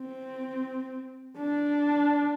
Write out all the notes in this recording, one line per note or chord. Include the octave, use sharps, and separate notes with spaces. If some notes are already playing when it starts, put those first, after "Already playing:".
Already playing: C4
D4